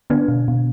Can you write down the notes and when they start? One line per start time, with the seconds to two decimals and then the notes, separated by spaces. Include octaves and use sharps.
0.10 D3 B3 D4
0.28 B2
0.48 B2